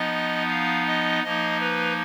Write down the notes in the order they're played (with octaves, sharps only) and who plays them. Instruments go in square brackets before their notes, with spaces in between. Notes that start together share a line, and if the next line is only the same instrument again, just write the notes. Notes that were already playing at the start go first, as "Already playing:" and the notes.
Already playing: [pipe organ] F3 B3 D#4 D#5
F5
D#5
F3 A#3 D#4 D#5
B4